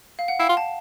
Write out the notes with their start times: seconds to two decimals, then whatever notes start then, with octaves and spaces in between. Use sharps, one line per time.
0.19 F5
0.28 F#5
0.39 E4 F5 G5
0.49 F4
0.57 A5